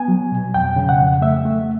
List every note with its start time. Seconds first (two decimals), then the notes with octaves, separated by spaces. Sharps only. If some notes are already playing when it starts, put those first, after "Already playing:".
Already playing: B3 G#5
0.08 F#3
0.32 B2
0.54 F2 G5
0.76 C#3
0.89 F#5
1.00 F2
1.22 A3 E5
1.45 A3